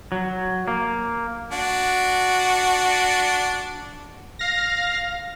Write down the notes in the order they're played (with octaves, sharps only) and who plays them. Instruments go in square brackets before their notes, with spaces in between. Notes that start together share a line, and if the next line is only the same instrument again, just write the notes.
[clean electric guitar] F#3
A#3
[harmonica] D4 F#4
[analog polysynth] F5 A#6